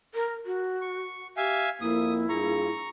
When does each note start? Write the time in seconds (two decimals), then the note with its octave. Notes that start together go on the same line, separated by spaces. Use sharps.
0.15 A#4
0.46 F#4
0.81 C#6
1.37 G4 E5 F5 G#5
1.81 F2 A#3 E4 D#6
2.29 G2 F4 G#4 A#5 C#6